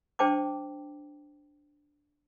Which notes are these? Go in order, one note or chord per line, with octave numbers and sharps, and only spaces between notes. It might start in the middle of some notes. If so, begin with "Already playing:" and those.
D4 C5 G5 A5 D6